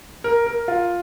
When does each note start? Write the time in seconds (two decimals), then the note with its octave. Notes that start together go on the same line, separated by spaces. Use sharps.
0.24 A#4
0.46 A#4
0.68 F4